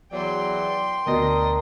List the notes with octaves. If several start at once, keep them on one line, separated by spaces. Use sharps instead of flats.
E2 E3 F#3 D5 G5 C6
D2 B2 D4 A#4 D#5